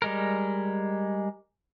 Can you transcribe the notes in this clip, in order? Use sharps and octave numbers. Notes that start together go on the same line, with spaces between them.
G3 G#3 A#4